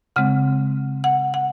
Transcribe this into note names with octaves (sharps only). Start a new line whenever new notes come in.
C#3 G#3 C4 F#5
F#5
F#5